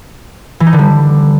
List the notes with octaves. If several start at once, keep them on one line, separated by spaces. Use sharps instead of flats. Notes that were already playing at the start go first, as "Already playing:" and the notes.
E3
D#4
D3
G3